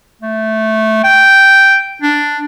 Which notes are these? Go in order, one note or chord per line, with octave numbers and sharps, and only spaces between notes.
A3
G5
D4